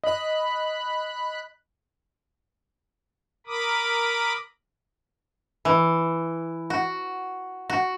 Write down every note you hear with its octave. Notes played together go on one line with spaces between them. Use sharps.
D#5 B5 F#6
A#4 B5 D6 D#6
E3
F#4
F#4